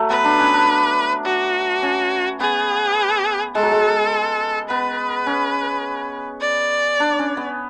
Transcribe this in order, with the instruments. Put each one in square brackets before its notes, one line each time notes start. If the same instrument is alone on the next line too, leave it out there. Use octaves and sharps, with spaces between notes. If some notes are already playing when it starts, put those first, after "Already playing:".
Already playing: [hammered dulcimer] F#3 A3
[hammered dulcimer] B3 [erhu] B4
[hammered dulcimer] D4
C#4
D4
[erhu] F#4
[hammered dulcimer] C#4
[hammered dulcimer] B3 [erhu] G#4
[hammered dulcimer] G#3 [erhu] A4
[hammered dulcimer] F#3
G#3
[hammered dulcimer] B3 [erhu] B4
[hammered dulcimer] C#4
[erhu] D5
[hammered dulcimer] D4
C#4
B3